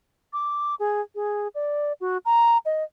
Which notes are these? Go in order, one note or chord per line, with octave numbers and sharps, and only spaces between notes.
D6
G#4
G#4
D5
F#4
A#5
D#5